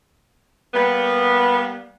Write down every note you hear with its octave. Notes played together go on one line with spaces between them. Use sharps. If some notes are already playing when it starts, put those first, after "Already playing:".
G3 A#3 B3